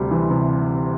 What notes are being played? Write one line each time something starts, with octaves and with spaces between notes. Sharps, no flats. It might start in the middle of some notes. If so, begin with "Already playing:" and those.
Already playing: D2 C3 G3
E3
C3